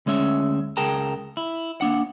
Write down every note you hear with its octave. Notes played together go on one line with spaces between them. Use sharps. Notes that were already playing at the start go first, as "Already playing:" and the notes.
D2 G#3 C#4 E5
C#2 G#4 A#4 G5 A5 A#5
E4
A#3 D4 F#5